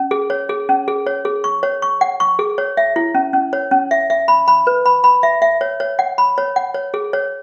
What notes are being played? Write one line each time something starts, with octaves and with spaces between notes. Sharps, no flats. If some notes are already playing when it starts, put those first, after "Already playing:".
Already playing: C#4
G#4
C#5
G#4
C#4
G#4
C#5
G#4
C#6
C#5
C#6
F#5
C#6
G#4
C#5
E5
E4
C#4
C#4
C#5
C#4
E5
E5
B5
B5
B4
B5
B5
E5
E5
C#5
C#5
F#5
B5
C#5
F#5
C#5
G#4
C#5